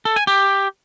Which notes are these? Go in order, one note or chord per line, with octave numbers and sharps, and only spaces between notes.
A4
G#5
G4